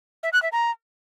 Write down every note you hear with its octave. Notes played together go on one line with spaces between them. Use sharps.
E5
F#6
E5
A#5